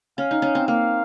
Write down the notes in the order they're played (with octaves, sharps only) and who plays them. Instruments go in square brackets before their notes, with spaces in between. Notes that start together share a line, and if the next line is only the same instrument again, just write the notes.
[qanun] C#4 [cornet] F5
[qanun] D#4
C#4
C4
[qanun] A#3 [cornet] F5